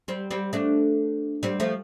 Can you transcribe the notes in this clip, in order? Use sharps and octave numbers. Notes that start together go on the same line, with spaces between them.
G3 C4
G3 C4
A3 D4
G3 C4
F3 A3